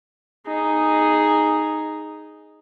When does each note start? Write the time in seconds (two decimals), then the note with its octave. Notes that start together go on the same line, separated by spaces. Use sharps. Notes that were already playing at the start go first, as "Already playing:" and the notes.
0.47 D#4 G#4